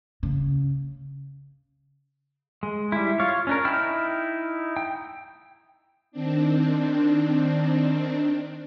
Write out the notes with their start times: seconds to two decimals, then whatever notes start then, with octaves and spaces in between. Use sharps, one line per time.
0.23 C#3
2.63 G#3
2.92 G3 E4
3.20 F4 C#5 F5
3.47 C#4 D4 A#4
3.65 D#4 E4 G5 B5 F6
4.77 G5
6.12 D#3 C4 D4